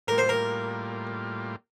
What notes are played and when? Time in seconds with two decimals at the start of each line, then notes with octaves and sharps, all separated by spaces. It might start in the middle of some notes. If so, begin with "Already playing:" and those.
0.08 A2 G3 A#3 F4 A#4
0.18 C5
0.29 A#4